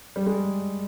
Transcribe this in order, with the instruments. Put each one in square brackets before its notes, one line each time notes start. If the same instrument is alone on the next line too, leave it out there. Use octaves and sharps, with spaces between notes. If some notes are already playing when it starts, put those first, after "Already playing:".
[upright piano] G3
G#3